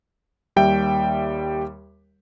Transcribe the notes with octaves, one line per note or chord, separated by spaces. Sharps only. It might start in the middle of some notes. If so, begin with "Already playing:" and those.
D#2 G3 E5 G5